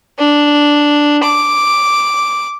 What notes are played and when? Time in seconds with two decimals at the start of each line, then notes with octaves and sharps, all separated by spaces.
0.18 D4
1.23 D6